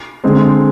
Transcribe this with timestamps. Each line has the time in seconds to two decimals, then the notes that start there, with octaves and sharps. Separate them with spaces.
0.24 D3 G#3 C4